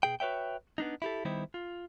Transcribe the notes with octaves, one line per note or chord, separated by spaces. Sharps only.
B2 G#4 G5
F#4 B4 C#5 E5 G5
B3 D4 D#4
E4 G4 A4
D#3 G3 B3 D#4 E4 C5
F4